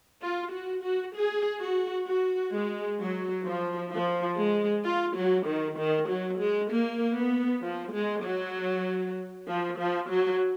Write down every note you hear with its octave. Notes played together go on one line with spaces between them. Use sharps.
F4
F#4
F#4
G#4
F#4
F#4
G#3
F#3
F3
F3
G#3
F4
F#3
D#3
D#3
F#3
G#3
A#3
B3
F3
G#3
F#3
F3
F3
F#3